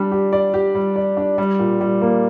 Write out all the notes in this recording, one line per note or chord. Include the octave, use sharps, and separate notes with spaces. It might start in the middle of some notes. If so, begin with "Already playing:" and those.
Already playing: G3 D4
G4
D5
G4
G3
D5
D4
G3
A#2
G3
A#3